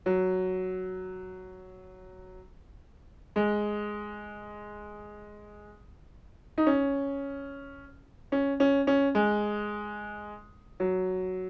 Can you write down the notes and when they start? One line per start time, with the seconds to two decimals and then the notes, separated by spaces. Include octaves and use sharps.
0.06 F#3
3.36 G#3
6.58 D#4
6.67 C#4
8.32 C#4
8.60 C#4
8.87 C#4
9.15 G#3
10.80 F#3